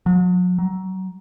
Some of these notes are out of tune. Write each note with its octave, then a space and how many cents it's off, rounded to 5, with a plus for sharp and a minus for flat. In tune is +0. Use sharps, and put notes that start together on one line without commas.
F#3 -40
F#3 +25